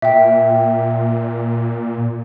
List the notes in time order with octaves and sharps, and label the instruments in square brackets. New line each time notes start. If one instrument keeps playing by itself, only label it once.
[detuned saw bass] A#2 [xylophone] E5 G5